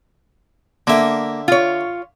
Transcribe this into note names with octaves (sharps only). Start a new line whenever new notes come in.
D3 A#3 E5
F4 C#5